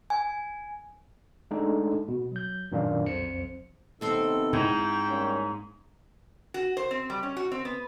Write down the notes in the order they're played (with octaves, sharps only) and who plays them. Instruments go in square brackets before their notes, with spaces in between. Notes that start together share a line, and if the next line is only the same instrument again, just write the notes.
[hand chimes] G#5
[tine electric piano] G#3 A3 D4 D#4 A4
B2
F#3 G6
F#2 A#2 D#3 D4 D5 F5
B1 F2 C5 C#7
[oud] D#2 C4 C5 [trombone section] C3 B3 D#4 [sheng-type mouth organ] A4
[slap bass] G#2 [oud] E4 [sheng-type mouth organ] G5
[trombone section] G3 A#3 C#4
[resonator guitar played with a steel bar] F#4
C5
C4
G3
C#4
F#4
C4
B3